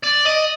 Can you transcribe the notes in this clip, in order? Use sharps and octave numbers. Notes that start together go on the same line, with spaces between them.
D5
D#5